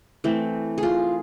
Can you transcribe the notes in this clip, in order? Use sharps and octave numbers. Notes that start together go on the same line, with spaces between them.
E3 A3 C4
G#4
F4